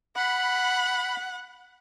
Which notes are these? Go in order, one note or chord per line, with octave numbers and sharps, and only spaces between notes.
F#5 B5